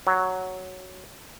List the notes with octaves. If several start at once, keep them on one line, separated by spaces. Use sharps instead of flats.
F#3